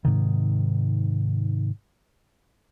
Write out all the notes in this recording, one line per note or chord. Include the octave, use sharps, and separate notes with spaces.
G#2 C3 D#3